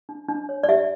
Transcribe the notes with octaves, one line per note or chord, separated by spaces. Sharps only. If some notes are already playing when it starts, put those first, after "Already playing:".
D4
D4
C#5
D5
G4 E5